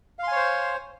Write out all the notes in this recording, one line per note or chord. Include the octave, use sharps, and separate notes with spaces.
C5 C#5 F5 G#5 C6